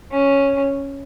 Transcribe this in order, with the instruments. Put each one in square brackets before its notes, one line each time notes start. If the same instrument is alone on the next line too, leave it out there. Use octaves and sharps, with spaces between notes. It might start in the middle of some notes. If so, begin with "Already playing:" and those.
[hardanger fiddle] C#4